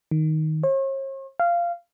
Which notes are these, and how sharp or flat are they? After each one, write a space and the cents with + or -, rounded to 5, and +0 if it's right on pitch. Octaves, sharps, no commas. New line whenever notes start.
D#3 +5
C#5 -45
F5 -15